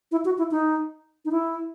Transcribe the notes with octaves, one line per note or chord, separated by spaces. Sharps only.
E4
F#4
E4
D#4
D#4
E4